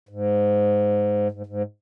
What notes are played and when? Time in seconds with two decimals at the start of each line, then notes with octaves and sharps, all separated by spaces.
0.09 G#2
1.32 G#2
1.46 G#2